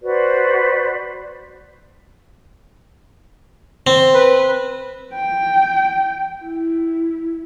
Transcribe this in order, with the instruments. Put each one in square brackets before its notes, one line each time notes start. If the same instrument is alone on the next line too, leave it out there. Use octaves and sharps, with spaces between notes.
[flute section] F#4 B4 C5 D5
[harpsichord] C4
[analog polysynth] B4
[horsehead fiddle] G5
E4